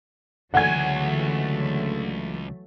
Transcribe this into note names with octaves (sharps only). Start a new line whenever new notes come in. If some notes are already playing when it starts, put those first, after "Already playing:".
C#2 D3 E3 F#3 A3 F#5 G#5 G#6